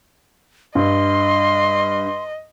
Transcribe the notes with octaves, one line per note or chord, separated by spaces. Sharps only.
G2 D#5 C6